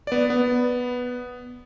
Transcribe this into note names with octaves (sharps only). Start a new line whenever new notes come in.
B3 D5
B3